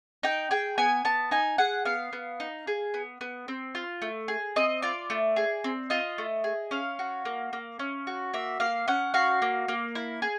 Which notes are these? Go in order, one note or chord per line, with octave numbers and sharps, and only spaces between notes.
D#4 G5
G#4 G5
B3 G#5
B3 A5
D#4 G#5
G#4 F#5
B3 F5
B3
D#4
G#4
B3
B3
C4
F4
A3
G#4
C4 D#5
F4 D5
A3
G#4
C4
F4 D#5
A3
G#4
C#4 F5
F#4
A#3
A#3
C#4
F#4
A#3 E5
A#3 F5
C#4 F#5
F#4 F5
A#3
A#3
E4
G#4